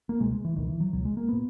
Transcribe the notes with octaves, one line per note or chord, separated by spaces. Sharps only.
A#3
C#2 B2 G#3
G#3
E3
C#2 B2 D#3
E3
F#3
C#2 B2 F#3
G#3
A#3
A#2 B3